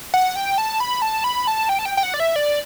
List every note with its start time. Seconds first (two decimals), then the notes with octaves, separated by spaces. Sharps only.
0.14 F#5
0.36 G5
0.58 A5
0.80 B5
1.02 A5
1.24 B5
1.47 A5
1.69 G5
1.79 A5
1.85 G5
1.97 G5
2.03 F#5
2.14 D5
2.20 E5
2.36 D5